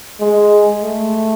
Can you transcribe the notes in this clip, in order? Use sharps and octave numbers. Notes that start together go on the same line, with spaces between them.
G#3
A3